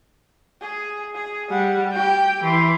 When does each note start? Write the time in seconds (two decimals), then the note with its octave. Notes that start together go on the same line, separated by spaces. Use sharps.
0.61 G#4
1.15 G#4
1.50 G3 F#5
1.93 G4 G5
2.44 E3 C6